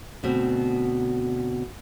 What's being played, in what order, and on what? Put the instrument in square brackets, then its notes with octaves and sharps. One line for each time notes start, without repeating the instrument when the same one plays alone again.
[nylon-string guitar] D2 B2 C4